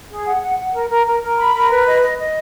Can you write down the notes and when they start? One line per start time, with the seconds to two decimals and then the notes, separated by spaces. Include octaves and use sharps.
0.10 G#4
0.26 F#5
0.42 F#5
0.59 F#5
0.74 A#4
0.90 A#4
1.07 A#4
1.22 A#4
1.39 B5
1.55 A#4
1.70 B4
1.86 D#5
2.02 D#5
2.18 D#5